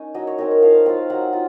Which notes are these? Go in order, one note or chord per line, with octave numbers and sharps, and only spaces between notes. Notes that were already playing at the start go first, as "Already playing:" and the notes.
Already playing: C#4 D#4 G#5
F#3 D#5
C#5
C4 D#4 A#4
C#5
F3 F5
C4 F4 F5
F#3 F#5
F4